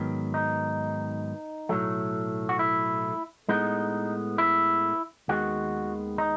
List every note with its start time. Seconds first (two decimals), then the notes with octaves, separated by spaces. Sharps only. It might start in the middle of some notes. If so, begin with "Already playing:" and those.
Already playing: G#2 D#3 F#3 B3
0.34 D#4
1.69 B1 A2 F#3 A3
2.49 F#4
2.59 E4
3.49 A2 G#3 B3 D#4
4.38 E4
5.28 D#2 D#3 G#3 B3 F#4
6.18 D#4